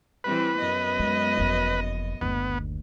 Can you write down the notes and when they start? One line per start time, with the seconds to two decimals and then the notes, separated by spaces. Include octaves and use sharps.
0.24 E3 G3 C4 B4
0.59 F#2 B3 D#5
1.00 G#3
1.37 F#1 F2
2.21 F#1 D2 B3